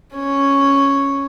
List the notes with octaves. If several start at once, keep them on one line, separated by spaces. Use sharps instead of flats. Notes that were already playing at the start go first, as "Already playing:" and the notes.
C#4 C#5